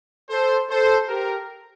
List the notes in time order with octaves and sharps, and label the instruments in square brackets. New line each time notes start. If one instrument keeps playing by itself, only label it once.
[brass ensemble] A4 C5
A4 C5
G4 A#4